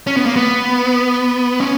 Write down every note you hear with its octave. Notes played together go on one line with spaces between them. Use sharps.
C#4
B3
A#3
B3
C#4